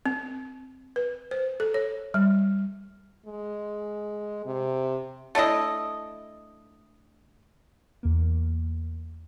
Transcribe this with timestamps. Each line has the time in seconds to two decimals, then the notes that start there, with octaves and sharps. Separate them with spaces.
0.06 C4
0.96 B4
1.31 C5
1.60 A4
1.74 C#5
2.14 G3
3.26 G#3
4.45 C3
5.35 A3 D4 E4 D#5
8.03 E2 A#3